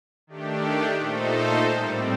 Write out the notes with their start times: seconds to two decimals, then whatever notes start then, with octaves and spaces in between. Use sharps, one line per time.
0.27 D#3 A3 D4 G4
0.99 A#2 A3 D#4 A4 C5
1.72 A2 G3 C4